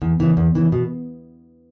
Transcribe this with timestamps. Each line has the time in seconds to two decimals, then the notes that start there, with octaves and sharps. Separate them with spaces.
0.02 E2
0.20 C#3 E3
0.37 E2
0.55 C#3 E3
0.72 B2